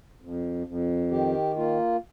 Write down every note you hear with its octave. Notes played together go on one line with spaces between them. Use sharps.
F2
F2
D#3 G4
A#3 F4